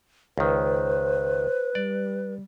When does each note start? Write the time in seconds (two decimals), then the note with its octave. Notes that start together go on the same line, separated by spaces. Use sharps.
0.38 C#2 D#3 B4 C5
1.75 G3 D5